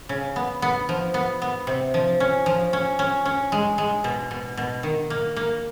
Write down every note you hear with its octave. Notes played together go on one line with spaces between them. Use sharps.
C#3
B3
B3
F3
B3
B3
C3
F3
C#4
F3
C#4
C#4
C#4
G#3
G#3
B2
B2
B2
D#3
A#3
A#3